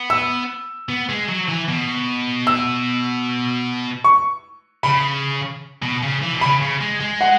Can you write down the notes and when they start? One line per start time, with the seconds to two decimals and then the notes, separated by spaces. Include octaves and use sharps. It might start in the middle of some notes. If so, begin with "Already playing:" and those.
Already playing: B3
0.10 E6
0.90 B3
1.09 G#3
1.28 F#3
1.48 E3
1.68 B2
2.47 E6
4.04 C#6
4.83 C#3 B5
5.83 B2
6.03 C#3
6.22 E3
6.33 B2
6.41 C#3 B5
6.61 C#3
6.81 G#3
7.01 G#3
7.21 F#5